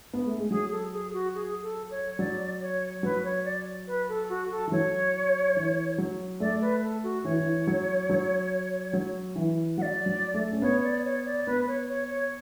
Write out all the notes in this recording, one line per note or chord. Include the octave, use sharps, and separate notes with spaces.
B3
A3
G#3
F#3 G#4
A4
G#4
F#4
G#4
A4
C#5
F#3 D5
C#5
F#3 B4
C#5
D5
B4
A4
F#4
A4
E3
F#3 C#5
E3
F#3
A3 D5
B4
A4
F#4
E3 C#5
E3
F#3
F#3
F#3
E3
F#3 D5 F#5
F#3
A3
C#4
B3 C#5
D5
C#5
D5
B3 B4
C#5
C#5
C#5